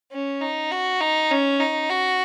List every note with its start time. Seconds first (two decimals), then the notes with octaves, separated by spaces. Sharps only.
0.12 C#4
0.41 D#4
0.72 F#4
1.01 D#4
1.31 C#4
1.60 D#4
1.90 F#4